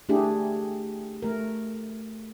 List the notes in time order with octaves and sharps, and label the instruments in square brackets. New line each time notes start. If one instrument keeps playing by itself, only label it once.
[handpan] A3 D4 E4 G4 G#4
A3 A#4